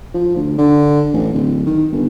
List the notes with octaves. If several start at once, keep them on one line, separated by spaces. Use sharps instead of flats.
F3
D2
D3
A1
D1
D#3
G1